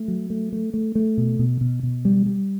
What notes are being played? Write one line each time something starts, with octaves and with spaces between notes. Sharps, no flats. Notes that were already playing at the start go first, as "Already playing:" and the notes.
Already playing: A3
F#3
A3
A3
A3
A3
B2
B2
B2
B2
G3
G3